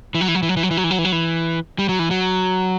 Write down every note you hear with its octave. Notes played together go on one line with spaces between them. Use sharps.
E3
F#3
E3
F#3
E3
F#3
E3
F#3
E3
F#3
E3
F#3
E3
F#3
E3
G3
F#3
E3
F#3